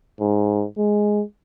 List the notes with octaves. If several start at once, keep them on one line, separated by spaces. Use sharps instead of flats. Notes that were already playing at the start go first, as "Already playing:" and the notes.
G#2
G#3